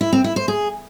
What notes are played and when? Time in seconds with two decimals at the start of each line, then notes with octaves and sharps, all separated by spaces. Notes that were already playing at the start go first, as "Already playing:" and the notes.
0.01 E4
0.13 C4
0.24 E4
0.36 C5
0.48 G#4